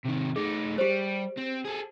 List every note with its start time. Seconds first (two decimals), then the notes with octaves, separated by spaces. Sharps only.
0.05 C3 D#3
0.36 A3 D#4 G#4
0.78 G3 G4 C5
1.38 C4
1.65 G#4 A4